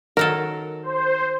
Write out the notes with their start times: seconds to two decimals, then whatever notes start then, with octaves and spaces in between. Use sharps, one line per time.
0.17 D#3 F#3 A4 A#4
0.83 C5